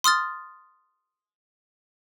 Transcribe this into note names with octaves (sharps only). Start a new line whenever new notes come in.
C6 D#6 F6 A6